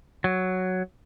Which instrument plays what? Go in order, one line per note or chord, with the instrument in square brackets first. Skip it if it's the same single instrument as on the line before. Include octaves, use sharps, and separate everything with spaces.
[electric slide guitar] F#3